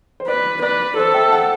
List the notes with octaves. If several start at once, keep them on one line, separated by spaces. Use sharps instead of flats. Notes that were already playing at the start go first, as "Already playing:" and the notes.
C5
B4 D5
B4 D5
A4 C5
E5 G5
F#5 A5